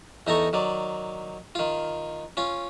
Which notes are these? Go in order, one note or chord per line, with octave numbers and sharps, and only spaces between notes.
E2 D#4 A4 A#5 C#6
D#3 F#3 D5
D#3 F4
C#4 F4